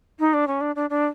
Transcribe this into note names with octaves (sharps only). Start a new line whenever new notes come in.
D#4
D4
C#4
D4
D4
D4